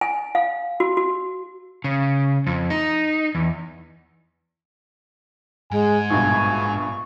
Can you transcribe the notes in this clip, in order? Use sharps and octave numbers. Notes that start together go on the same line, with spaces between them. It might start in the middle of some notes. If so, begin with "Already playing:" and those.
G#5
F5
F#4
F#4
C#3
F2
D#4
E2
G#2 G#3 G#5
A#1 G2 B2 C#6